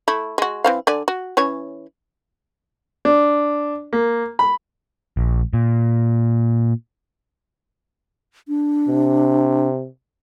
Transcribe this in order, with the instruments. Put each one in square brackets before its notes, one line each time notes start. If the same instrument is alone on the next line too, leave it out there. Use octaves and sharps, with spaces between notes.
[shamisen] A3 E4
G#3 F#4
E3 C4 F5
D3 D5 G#5
F#4
E3 C#4 C#5
[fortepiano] D4
A#3
B5
[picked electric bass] A#1
A#2
[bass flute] D4
[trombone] C3